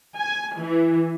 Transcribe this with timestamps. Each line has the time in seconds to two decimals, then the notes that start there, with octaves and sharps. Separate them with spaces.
0.19 G#5
0.60 E3